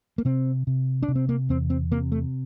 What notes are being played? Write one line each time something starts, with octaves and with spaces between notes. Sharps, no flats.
A#3
C3 C4
C3
D4
C3
C4
A#3
E2 C4
C4
C3 A#3
A3